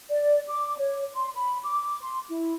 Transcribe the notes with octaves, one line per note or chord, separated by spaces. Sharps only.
D5
D6
C#5
C6
B5
D6
C6
E4